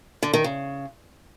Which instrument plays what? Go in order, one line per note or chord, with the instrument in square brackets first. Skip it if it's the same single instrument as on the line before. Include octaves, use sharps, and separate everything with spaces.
[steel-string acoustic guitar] D3
D#3
C#3